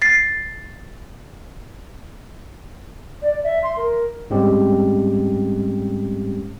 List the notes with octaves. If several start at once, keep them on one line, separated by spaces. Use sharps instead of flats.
A6 C7
D5
E5
C6
A#4
G#2 G3 G#3 C4 C#4 G4